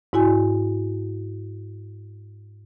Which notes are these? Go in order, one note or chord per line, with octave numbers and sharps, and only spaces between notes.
G#2 E4 F#4 G#5